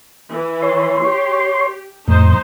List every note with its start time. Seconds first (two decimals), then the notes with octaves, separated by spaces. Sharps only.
0.30 E3
0.62 C#5 C6
1.04 G4
2.08 F2 A2 D#4 C5